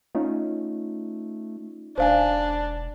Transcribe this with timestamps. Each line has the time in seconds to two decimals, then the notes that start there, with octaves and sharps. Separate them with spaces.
0.15 A3 C#4 D#4 F4
1.98 E1 D4 C5 F5 G#5